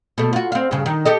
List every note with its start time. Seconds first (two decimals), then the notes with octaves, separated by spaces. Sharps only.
0.18 B2 A3
0.33 F4 F#4
0.52 C4 F5
0.71 G2 C#3
0.86 D#3
1.05 G4 A4 D#5